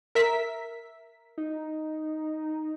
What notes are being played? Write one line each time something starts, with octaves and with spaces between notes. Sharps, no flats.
A#4 E5 B6
D#4